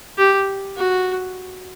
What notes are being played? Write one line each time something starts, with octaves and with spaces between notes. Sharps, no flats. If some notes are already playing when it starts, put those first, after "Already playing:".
G4
F#4